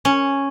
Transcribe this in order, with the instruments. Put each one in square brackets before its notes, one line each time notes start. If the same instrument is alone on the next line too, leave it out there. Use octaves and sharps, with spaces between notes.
[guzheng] C#4